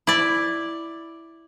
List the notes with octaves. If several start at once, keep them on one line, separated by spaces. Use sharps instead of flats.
E4 D5